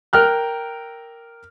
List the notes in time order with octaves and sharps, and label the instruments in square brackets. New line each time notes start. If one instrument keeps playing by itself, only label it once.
[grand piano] A#4 G5 F6 F#6